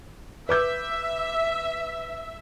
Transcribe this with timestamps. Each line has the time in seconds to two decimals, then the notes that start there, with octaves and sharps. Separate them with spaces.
0.49 B4 E5 D6 G6